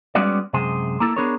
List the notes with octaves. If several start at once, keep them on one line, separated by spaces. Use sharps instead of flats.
G3 G#3 B3 C#4 F#4 D5
F#2 C3 G#3 G#4 C5
A#3 E4 A4
B3 D4 G#4 A#4 C#5